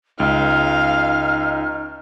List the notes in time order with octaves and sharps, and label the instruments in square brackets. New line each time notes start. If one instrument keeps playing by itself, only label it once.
[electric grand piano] C#2 [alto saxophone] D#4 [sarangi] F5 [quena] F6